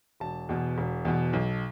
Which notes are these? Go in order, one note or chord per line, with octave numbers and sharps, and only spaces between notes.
E1 A5
E2 B2
E1
E2 B2
B1